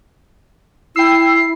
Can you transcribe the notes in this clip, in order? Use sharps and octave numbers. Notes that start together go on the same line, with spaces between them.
E4 G5 E6 C7